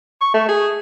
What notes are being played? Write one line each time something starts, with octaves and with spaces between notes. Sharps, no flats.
C#6
A3
G#4